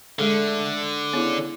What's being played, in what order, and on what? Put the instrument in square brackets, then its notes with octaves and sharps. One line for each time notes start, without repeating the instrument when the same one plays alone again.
[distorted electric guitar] D3 [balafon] G#3 G#4 [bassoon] A3
[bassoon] C#3 [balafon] B3 E4